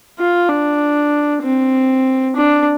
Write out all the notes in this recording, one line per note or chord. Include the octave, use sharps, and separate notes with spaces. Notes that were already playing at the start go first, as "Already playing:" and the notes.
F4
D4
C4
D4